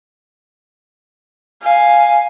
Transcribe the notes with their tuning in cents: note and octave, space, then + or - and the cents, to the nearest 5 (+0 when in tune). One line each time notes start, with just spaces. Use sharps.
F5 +0 G#5 +0